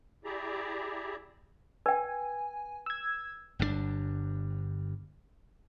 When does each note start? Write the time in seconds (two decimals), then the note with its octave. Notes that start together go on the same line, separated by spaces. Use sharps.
0.24 E4 G4 G#4 D5 E5 A#5
1.86 B4 G5 G#5
2.86 E6 G#6
3.59 G1 G2 A#2 D4